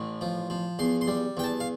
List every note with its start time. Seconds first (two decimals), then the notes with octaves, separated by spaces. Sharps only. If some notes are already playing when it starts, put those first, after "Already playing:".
Already playing: A1 A2
0.21 F3
0.50 F3
0.79 E2 C6
1.01 C6
1.08 G3
1.37 E2 G5
1.44 A5
1.60 F5